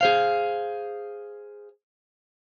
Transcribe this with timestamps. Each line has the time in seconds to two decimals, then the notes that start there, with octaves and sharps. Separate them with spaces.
0.01 G#4 C5 F5